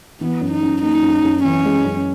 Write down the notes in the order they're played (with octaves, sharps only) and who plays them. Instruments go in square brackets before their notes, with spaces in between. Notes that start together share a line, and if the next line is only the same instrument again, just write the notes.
[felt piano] E3 [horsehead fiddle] B3
[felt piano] F#2
[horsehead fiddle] D#4
[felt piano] F#2
[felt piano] A#3 [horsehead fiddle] D#4
[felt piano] F#2
F#2
[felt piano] E3 [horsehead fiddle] C#4
[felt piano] G#3
F#2